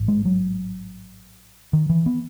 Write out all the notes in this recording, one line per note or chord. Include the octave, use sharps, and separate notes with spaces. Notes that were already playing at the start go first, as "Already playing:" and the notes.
Already playing: A1 G#2
G#3
F#3
D#3
E3
B3